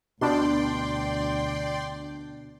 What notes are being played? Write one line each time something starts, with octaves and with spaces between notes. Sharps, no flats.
D2 B2 D4 D5 G5 C6